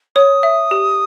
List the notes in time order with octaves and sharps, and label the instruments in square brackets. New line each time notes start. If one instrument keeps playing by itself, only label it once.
[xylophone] C#5 [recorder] D#6
[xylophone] E5
G4